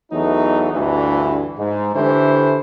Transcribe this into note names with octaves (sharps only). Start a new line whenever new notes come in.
E2 E3 F#3 A3 D#4
D2 G2 E3
G#2
D3 E3 A3 E4 G4 C5